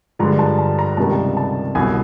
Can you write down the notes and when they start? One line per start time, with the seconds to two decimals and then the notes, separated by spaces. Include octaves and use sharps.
0.19 G2 D3 F3 G#3 A#5
0.39 A5
0.59 A5
0.79 A#5
0.97 C#2 C3 D#3 G3 A5
1.37 A5
1.75 C2 B2 F#3 G#5